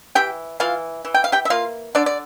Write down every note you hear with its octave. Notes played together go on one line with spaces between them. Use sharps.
E3 G4 G5
E3 F4 F5
E3
G5
F5
G4 G5
E5
A#3 F4 F5
D3 D4 D5
D5